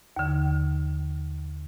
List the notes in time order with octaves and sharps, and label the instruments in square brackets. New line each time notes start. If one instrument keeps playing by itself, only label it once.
[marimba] D#2 D3